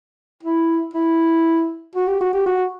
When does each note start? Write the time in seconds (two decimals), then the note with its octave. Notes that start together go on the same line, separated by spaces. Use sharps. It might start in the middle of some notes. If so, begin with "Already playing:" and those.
0.43 E4
0.94 E4
1.95 F#4
2.07 G4
2.20 F#4
2.33 G4
2.46 F#4